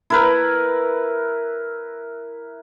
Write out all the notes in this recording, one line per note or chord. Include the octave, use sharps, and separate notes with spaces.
E4 A#4 B4